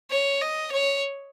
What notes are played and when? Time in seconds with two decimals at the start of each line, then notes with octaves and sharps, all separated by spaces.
0.10 C#5
0.41 D#5
0.72 C#5